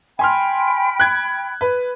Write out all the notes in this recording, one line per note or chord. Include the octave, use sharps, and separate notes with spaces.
G5 G#5 B5 C6 F6
F#6 G#6
B4